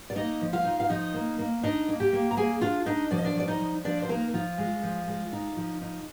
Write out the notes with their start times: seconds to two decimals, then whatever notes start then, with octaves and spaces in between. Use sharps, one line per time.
0.10 D5
0.16 A#3 D#4 D#5
0.41 F3
0.53 F4 F5
0.65 D#4
0.80 F5
0.89 F3 D#4 D#5
1.14 A#3
1.39 A#3
1.63 D4 D#4 D#5
1.88 A#3
2.00 G4 G5
2.13 A#3
2.31 A#5
2.37 A#3 G#4 G#5
2.61 D4 F4 F5
2.86 D4 D#4 D#5
3.11 F3 D5
3.18 D#5
3.24 D4 D5
3.35 F3 D5
3.48 D#4 D#5
3.60 F3
3.85 F3 D4 D5
4.02 C5
4.09 A#3 D#4 A#4
4.33 F3 F4
4.58 G#3
4.83 F3
5.08 G#3
5.33 D#4
5.57 F3
5.81 D#4